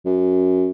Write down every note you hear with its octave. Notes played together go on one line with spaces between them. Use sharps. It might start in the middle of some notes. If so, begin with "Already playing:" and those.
F#2